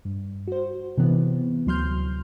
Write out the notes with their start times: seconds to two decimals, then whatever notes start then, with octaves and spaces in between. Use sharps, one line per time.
0.05 G2
0.47 F#4 C5
0.98 C3 E3 B3
1.67 D2 F#3 C6 F6 G6